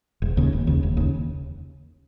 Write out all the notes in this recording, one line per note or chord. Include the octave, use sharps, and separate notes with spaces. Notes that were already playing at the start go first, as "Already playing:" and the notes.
E1
D#2 C#3
E1
D#2 C#3
E1
D#2 C#3